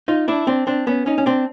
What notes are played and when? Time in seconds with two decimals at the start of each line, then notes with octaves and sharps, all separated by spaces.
0.08 D#4 F4
0.28 D4 E4
0.47 C4 D4
0.67 C4 D4
0.87 B3 C#4
1.06 C#4 D#4
1.18 C#4
1.26 C4 D4